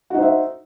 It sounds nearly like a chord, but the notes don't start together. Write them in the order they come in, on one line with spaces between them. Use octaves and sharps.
F#4 D#4 C5 E5